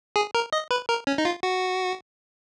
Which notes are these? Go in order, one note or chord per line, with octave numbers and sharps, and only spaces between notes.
G#4
A#4
D#5
B4
A#4
C#4
D#4
F4
F#4